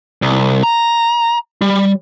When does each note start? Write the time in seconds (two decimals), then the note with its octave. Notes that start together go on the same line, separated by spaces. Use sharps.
0.22 C2
0.63 A#5
1.62 G3